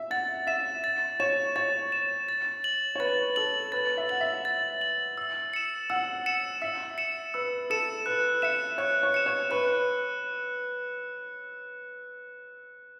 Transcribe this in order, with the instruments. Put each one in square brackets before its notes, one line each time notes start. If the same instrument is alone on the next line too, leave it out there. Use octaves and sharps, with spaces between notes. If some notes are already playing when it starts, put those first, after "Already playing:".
Already playing: [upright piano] E5
[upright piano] F#5 [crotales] A6
[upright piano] E5 [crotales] E7
[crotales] A6
[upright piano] C#5 [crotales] E7
[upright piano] C#5 [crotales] A6
[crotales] E7
A6
F#7
[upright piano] C#5
[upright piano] B4 [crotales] A6
[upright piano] A4 [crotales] F#7
[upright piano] B4 [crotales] A6
[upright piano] E5
[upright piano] F#5 [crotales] F#7
[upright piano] E5
[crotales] A6
F#7
E6
C#7 E7
[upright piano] F#5 [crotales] E6
[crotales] C#7 E7
[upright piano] E5 [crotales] E6
[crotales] C#7 E7
[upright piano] B4 [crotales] E6
[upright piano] A4 [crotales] C#7 E7
[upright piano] B4 [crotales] F#6
[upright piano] E5 [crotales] C#7 E7
[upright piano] C#5 [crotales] F#6
[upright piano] C#5
[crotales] C#7 E7
[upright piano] C#5
[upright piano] B4 [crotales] F#6